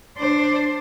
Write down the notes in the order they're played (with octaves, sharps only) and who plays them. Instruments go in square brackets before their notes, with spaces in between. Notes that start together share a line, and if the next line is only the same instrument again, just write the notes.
[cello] D4 C5